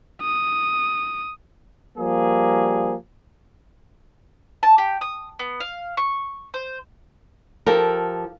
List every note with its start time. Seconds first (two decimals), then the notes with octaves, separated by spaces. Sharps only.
0.21 D#6
1.98 F3 G3 A#3 G#4
4.63 A5
4.78 G4
5.01 D#6
5.39 B3
5.60 F5
5.97 C#6
6.54 C5
7.66 F3 G4 A4 A#4